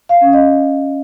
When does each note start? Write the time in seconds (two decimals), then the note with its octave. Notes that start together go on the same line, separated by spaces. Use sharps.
0.09 F5
0.21 C#4
0.33 D#5